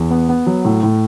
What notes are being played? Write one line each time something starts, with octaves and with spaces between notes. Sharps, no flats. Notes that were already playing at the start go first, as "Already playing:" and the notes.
Already playing: E2
B3
B3
F#3
A2
A2